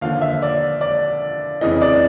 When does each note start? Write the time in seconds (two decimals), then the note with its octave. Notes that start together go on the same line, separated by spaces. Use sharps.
0.01 D#2 D3 F3 F5
0.22 E5
0.42 D5
0.81 D5
1.61 F2 C#3 E3 D#5
1.82 D5